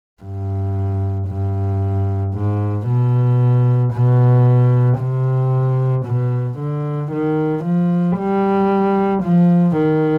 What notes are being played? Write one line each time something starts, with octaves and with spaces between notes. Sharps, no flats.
G2
G2
G#2
B2
B2
C3
B2
D3
D#3
F3
G3
F3
D#3